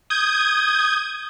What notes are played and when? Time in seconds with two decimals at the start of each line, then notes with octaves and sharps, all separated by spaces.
0.10 D#6 G6 G#6